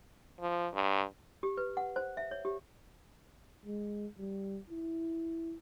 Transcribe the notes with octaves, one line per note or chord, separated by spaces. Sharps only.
F3
G2
G4
B4
F#5
C5
E5
C#5
G4
G#3
G3
E4